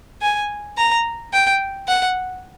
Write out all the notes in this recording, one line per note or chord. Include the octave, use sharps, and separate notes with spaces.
G#5
A#5
G5
F#5